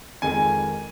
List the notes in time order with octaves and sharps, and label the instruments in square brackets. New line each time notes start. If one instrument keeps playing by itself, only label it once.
[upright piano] F2 D#3 G#3 [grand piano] G#5